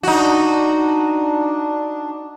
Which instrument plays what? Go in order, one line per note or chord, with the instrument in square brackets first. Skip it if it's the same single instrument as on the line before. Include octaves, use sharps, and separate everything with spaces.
[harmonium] D4 [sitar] D#4 F#4